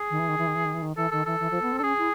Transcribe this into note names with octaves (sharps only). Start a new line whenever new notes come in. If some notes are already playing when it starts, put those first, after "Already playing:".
Already playing: G#4
D#3
E3
D#3
E3
D#3
E3
D#3
E3
D#3
E3 A4
D#3 A4
E3 A4
E3
F3
B3
C4
D4 A4
C#4 G#4
E4